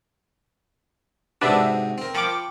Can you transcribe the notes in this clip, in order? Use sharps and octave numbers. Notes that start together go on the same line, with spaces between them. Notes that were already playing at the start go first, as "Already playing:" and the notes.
G#2 C3 D4 F#4 B4 E5
C4 A#4
F3 G5 B5 C#6 D6